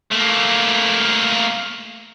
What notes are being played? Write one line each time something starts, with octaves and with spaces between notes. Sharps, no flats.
A3 A#3